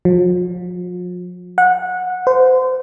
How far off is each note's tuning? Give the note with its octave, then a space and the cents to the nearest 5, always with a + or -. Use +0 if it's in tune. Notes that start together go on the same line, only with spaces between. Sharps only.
F3 +40
F#5 -20
C5 -30